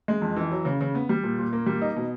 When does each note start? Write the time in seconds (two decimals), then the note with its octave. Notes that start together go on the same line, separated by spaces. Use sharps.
0.08 G#3
0.22 F2
0.36 E3
0.51 F#3
0.65 C#3
0.81 C#3
0.95 B3
1.09 G3
1.23 A#2
1.39 A#2
1.53 A#3
1.66 G3
1.82 D#4
1.96 B2